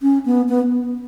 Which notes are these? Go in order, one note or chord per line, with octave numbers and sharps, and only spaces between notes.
C#4
B3
B3